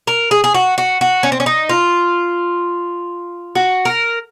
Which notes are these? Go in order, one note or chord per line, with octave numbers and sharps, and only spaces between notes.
A#4
G#4
G#4
F#4
F#4
F#4
C#4
C4
C#4
D#4
F4
F#4
A#4